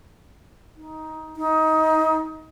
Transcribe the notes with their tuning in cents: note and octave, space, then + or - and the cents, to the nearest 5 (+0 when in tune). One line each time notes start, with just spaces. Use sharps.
D#4 +15
D#4 +20